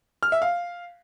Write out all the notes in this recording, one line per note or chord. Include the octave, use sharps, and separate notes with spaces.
F6
E5
F5